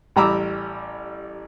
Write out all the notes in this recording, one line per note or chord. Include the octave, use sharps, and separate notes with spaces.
A1 G3 A#5 B5 D6 E6